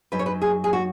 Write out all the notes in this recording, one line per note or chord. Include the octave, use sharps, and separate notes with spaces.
F#2 F#3 D#4 B4
C#5
B4
G#4
G#4
F#4